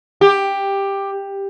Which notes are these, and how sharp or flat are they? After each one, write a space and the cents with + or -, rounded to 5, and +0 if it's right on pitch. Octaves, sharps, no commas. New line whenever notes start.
G4 +10